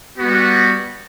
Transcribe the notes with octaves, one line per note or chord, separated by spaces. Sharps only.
G3 B3 F#4